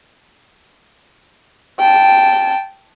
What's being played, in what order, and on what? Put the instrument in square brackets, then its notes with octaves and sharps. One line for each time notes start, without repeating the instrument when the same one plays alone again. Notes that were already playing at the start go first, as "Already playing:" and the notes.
[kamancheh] G5 A5